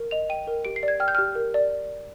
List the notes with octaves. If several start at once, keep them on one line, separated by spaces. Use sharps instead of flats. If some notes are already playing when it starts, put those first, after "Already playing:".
Already playing: A#4
D#5 F7
G5 D#7
A#4
G4 D7
C7
D5
G#6
G5 F6
G6
G4 F6
A#4
D5